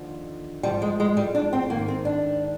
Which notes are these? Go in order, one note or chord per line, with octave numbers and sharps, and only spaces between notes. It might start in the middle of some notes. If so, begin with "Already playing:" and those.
Already playing: D#2 D3 F3
G#2 F3 G3
G#3
G#3
G3
D4
C4
G#2 D#3 A#3
C4
D4